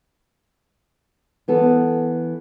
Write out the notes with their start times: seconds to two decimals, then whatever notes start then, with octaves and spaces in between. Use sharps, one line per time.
1.48 E3 B3 A4